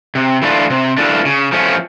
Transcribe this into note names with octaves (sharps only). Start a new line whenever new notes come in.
C3
E3 A3 D4 F4
C3
E3 A3 D4 F4
C#3
F3 A3 C#4